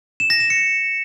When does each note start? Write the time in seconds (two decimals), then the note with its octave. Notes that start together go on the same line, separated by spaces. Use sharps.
0.20 E7
0.30 A#6
0.40 E7
0.50 C#7